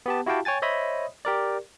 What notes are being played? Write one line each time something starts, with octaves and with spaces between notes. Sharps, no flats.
B3 G4 A5
E4 F#4 G4 F5 G5 A5
C#5 G5 G#5 A6
C5 C#5 D#5 E5 B5 D#6
G4 A#4 D5